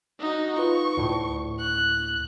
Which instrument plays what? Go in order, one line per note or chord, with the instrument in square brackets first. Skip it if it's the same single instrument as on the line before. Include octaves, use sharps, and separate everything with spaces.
[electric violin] D#4 F#4
[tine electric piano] F4 B4 [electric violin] C#6
[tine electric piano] D2 A2
[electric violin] F#6